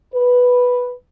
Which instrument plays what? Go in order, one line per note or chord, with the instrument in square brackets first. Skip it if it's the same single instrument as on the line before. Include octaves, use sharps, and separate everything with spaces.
[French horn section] B4